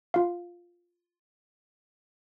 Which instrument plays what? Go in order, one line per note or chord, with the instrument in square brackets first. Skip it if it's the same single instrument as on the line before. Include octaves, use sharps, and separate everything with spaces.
[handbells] F4 F5